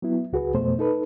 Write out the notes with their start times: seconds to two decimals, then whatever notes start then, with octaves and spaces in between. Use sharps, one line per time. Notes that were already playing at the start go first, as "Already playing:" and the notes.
0.02 F#3 B3 E4
0.33 C#2 F#4 G#4 B4
0.54 F2 B2 A3 C5
0.79 D#4 A4 B4